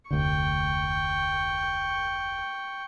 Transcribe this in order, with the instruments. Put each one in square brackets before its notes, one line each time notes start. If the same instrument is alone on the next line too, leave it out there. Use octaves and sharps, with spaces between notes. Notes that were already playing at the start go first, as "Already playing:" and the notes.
[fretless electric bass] F1 D2 D3 [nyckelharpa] G5 C#6